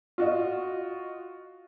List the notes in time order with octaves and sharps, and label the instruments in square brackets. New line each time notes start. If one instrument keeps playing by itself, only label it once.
[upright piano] F4 F#4 D#5